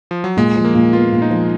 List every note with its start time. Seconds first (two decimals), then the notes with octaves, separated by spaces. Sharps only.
0.11 F3
0.24 F#3
0.37 A#2 G#3
0.56 F3
0.65 A#3
0.75 A#2
0.93 B3 F4
1.12 A#2
1.22 D#4
1.30 F3